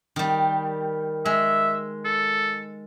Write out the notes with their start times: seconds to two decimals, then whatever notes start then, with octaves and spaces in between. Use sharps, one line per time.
0.16 D#3 G3
1.26 G#3 E5
2.05 A4